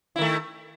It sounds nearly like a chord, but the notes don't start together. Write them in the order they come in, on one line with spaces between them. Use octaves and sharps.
E4 D#3 A3